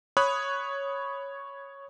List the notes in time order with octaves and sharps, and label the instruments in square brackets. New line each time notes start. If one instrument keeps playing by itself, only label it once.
[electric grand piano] C#5 B5 D#6 F#6